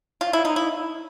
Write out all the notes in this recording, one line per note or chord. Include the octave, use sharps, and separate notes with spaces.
F4
E4
D#4
E4